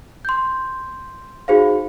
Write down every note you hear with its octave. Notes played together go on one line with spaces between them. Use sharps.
C6 G6
D#4 F#4 G#4 C5 F5